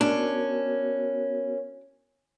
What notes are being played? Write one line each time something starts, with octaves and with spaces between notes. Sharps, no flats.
B3 C#4 D4 F#4 A#4